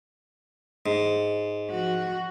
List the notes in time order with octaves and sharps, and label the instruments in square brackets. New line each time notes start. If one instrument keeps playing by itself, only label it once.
[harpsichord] G#2
[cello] F3 F#4